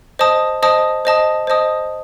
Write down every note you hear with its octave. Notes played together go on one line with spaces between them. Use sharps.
C5 D#5 A5 D#6
C5 D#5 A5 D#6
C5 D#5 A5 D#6
C5 D#5 A5 D#6